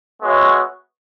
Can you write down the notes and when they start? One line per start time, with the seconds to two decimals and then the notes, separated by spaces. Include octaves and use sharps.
0.21 G#3 B3 F#4 C#5 E5